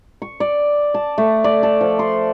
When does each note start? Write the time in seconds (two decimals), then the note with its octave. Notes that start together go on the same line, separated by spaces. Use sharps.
0.22 C#6
0.40 D5
0.94 A5
1.18 A3
1.44 D5
1.63 A4
1.81 F3
1.99 C6